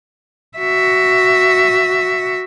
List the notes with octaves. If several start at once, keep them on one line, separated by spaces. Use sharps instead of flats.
F#4 E5